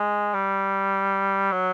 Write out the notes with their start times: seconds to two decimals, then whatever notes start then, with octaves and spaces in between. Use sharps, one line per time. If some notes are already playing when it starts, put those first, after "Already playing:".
Already playing: G#3
0.34 G3
1.52 F#3